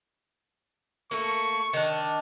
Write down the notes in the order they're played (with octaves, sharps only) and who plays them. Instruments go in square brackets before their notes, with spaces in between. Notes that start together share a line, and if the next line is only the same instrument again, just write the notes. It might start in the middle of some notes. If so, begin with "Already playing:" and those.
[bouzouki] A3 A#3 [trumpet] C#6
[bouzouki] D#3 D4